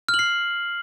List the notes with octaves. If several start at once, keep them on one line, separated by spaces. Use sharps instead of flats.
F6
F#7
C7